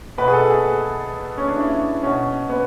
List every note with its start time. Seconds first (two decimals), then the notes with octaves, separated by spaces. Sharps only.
0.18 B2 B4
0.28 G#4
0.33 A4
0.49 G#4
1.37 C#4
1.48 D4
1.57 E4
2.03 B2 C#4
2.50 B3